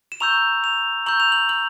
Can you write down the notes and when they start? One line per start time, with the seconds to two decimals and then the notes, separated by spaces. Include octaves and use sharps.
0.12 E7
0.20 A#5 C#6 E6 G6 F7
0.64 F7
1.06 A#5 C#6 E6 G6 F#7
1.20 F7
1.32 F#7
1.49 F#7